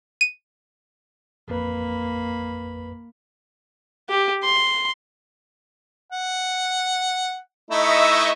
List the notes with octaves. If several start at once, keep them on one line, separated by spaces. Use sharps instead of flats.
D#7
A1 F2 A#3 B4 B5
G4
C6
F#5
A3 D#4 E4 D#5 E5 C#6